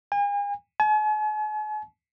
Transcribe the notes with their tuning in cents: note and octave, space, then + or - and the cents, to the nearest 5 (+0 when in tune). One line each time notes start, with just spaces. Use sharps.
G#5 -40
G#5 +45